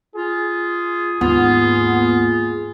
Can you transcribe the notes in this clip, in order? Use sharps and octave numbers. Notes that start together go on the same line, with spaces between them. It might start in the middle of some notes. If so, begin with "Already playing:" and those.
F4 G#4
D#2 G#2 B3 F4